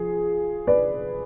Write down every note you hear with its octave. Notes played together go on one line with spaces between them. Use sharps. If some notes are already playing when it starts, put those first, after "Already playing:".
Already playing: F3 G#4
B4 D5